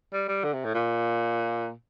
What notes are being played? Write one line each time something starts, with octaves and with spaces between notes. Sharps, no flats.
G3
G3
D3
C3
A2
A#2